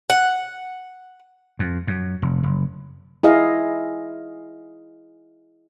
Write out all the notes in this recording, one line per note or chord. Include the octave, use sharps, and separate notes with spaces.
F#5
F2
F#2
F1
F#1
E4 G#4 D#5 F5